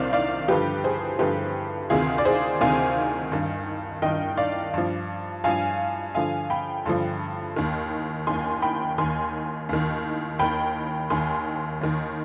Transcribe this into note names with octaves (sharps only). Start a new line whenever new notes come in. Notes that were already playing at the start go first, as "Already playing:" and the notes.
Already playing: C2 C3 D#3 C5 D5 F5
D5 F5
G2 D3 F3 G4 B4
G#4 C5
G2 D3 F3 G4 B4
D2 C3 D#3 F4 G#4
D5
G#4 C5
D2 C3 D#3 F5 G#5
G2 D#3
G2 D#3 D#5 G5
D5 F5
G2 F3
G2 F3 F5 G#5
G2 D3 F3 F5 G#5
G5 B5
G2 D3 F3
D#2 D#3
D#2 D#3 G#5 C6
G5 B5
D#2 D#3 G#5 C6
D#2 D#3
D#2 D#3 G5 B5
D#2 D#3 G#5 C6
D#2 D#3